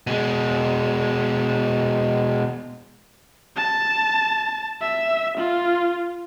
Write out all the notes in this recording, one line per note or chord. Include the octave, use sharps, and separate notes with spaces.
B2 G#3
A5
E5
F4